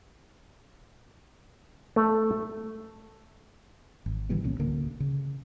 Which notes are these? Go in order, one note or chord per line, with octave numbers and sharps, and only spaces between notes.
A3
G#1
D3 E3 G3 B3
C2 A#2 C#4
D1 D2 D3 A#3
C#3